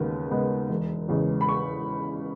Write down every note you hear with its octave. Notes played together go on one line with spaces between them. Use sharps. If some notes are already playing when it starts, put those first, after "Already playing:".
Already playing: D#2 C#3 G#3 B3
C#3 G#3 B3
E1
E2 C#3 G#3
B5
C#6